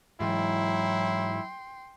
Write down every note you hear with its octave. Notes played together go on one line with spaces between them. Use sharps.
G#2 E3 F#3 E4 G5 C6